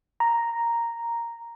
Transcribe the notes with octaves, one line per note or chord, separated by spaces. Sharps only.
A#5